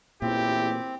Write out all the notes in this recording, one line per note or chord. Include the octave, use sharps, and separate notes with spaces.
A1 E2 A#2 C4 E4 G4